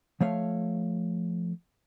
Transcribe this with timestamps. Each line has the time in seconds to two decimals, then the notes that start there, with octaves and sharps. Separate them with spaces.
0.21 F3 A3 C#5 F5